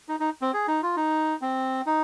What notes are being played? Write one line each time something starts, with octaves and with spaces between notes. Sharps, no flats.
D#4
D#4
C4
G#4
D#4
F4
D#4
C4
D#4